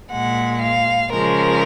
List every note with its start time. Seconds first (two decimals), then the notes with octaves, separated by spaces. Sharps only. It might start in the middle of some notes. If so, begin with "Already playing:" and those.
0.12 A#2 G#3 F#5
0.63 F5
1.12 C#3 F3 G#3 A#4